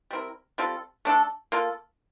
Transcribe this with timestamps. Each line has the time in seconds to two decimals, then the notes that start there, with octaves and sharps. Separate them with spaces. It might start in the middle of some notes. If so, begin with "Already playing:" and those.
0.11 G3 C4 E4 A#4
0.58 G3 C4 F4 A4
1.05 A3 D4 A4
1.52 A#3 F4 A4